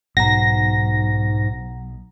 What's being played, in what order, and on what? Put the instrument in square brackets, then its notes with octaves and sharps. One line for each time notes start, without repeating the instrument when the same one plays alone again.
[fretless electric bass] B1 [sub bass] G#2 [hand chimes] F#5 A#5 [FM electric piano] A#6